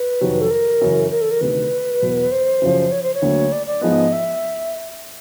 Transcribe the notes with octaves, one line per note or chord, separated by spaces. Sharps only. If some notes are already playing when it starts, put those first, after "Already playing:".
Already playing: B4
F2 C3 D#3 F#3
A4
A#4
F#2 C#3 E3
A#4
A4
A#4
D2 C3 D#3 B4
E2 B2 F#3
C5
F#2 C#3 F3
C#5
C5
C#5
D2 D3 F#3 A#3
D5
D5
G#2 F3 G#3 B3 D#5
E5